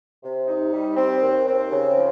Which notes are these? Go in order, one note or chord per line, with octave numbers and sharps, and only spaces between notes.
C3
D#4
G3
C4
D#2
C4
C#3
F3